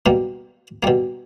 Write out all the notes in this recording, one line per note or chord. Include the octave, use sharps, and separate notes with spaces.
B2 G3 A#3
B2 G3 A#3